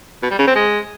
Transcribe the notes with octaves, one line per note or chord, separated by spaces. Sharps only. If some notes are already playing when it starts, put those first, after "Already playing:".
B2
G3
C#3
C4
G#3